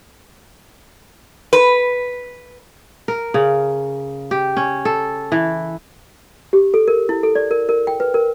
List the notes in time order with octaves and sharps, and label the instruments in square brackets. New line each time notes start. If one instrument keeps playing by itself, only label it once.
[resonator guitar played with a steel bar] B4
[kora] A#4
C#3
G4
C#4
A4
E3
[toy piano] G4
A4
A#4
E4
A4
D5
A#4
A#4
G5
B4
A#4